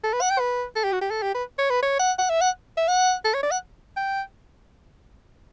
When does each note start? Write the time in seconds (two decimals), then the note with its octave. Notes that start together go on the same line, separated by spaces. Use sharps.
0.04 A4
0.13 B4
0.21 F#5
0.30 G5
0.39 B4
0.76 A4
0.84 G4
0.93 F#4
1.01 G4
1.11 A4
1.22 G4
1.35 B4
1.58 C#5
1.70 B4
1.82 C#5
1.99 F#5
2.18 F#5
2.30 E5
2.41 F#5
2.77 E5
2.88 F#5
3.25 A4
3.34 C#5
3.43 D5
3.51 F#5
3.97 G5